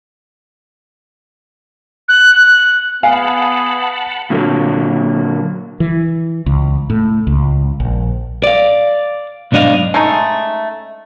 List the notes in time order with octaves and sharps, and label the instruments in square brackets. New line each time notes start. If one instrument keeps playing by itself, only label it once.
[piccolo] F#6
[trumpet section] B3 G#4 [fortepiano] F5 [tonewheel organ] F#5 A5 B5 [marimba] G#5
[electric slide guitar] A#2 D3 F#3 A#3
[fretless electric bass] E3
C#2
A2
C#2
A#1
[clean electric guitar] D5 F5
B1 G#2 D4 D#5 F5
[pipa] G#3 A3 C#4 D#4